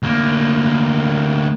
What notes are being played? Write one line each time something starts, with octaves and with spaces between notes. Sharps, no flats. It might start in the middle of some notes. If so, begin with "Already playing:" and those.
D2 A#3